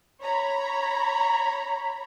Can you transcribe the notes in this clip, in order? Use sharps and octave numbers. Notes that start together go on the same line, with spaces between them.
C#5 A#5 B5